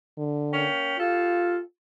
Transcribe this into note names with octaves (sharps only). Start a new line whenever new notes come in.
D3
A#3 C#4 G5
F4 G4 A4 F5